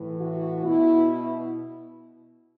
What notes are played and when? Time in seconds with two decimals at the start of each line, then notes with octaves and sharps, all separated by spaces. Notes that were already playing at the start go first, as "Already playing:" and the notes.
Already playing: A2 E3
0.21 F#4
0.64 B2 E4